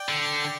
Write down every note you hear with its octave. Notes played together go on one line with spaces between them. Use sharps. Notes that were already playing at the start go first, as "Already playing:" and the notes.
Already playing: D5 G5
D3